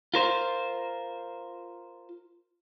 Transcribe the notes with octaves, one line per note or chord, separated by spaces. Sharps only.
F4 A#4 C5